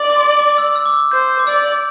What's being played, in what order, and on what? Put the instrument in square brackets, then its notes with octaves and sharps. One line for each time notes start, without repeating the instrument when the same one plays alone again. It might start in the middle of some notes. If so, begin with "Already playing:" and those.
Already playing: [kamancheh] D5
[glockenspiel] D6
C6
D6
E6
E6
D6
E6
[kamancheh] C5 [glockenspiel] G6
[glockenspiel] D6
[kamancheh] D5 [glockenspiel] E6